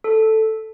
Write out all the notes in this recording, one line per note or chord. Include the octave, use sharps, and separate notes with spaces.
A4